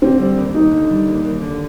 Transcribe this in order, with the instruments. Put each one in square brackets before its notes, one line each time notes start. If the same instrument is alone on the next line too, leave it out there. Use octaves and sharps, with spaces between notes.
[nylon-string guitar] D3 [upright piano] C4
[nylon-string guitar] G3
D#2
[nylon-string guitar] D#2 [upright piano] D#4
[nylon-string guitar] D3
G3
D#2
D#2
D3